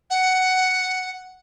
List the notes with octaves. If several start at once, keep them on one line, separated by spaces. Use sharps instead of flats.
F#5